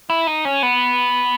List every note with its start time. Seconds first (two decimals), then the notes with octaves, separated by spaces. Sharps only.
0.10 E4
0.27 D#4
0.45 C#4
0.63 B3